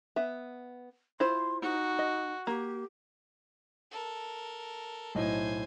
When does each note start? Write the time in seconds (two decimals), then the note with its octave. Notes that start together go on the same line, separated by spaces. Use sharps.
0.16 B3 E5
1.20 E4 F4 C5 C6
1.62 D#4 F#4
1.99 D#5
2.47 A#3 G4
3.91 A4 A#4
5.15 B1 A2 C5 D#5 G#5